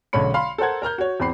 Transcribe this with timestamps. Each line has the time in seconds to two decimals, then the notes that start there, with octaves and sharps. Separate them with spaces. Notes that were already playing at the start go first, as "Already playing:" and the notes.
0.13 B1 D3 G#3 C#4 B5 C#7
0.34 F5 B5 C6
0.58 A4 A#4 C5 F#5 G#6
0.82 A#4 A#5 F6 G6
0.98 F#4 C#5
1.20 E2 C4 B5 C7